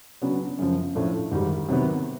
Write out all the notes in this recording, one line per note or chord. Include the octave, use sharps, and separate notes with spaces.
C#3 F#3 B3 D4
F#2 C#3 F3
A2 F3 A3 D4
G#2 D#3 G3
C3 D#3 F#3 B3